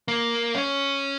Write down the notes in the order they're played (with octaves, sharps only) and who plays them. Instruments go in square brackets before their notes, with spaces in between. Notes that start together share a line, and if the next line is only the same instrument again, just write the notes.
[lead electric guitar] A#3
C#4